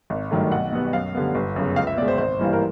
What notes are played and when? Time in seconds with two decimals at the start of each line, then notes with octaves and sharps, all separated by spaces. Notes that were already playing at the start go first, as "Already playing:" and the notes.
0.10 G#1
0.31 G2 D#3 F#3 A3
0.52 B1 F#5
0.72 B2 G3 B3
0.93 F#2 F5
1.15 D3 G3 B3
1.35 G1
1.56 F#2 C#3
1.76 C#2 F5
1.87 E5
1.97 B2 D5
2.02 G#3
2.08 C5
2.18 G#1 C5
2.39 G2 E3 G3 A#3
2.53 A#4